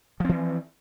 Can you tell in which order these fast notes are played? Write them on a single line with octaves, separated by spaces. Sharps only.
F3 C4 E3